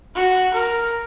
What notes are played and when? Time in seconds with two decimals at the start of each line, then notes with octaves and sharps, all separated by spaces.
0.15 F#4
0.54 A#4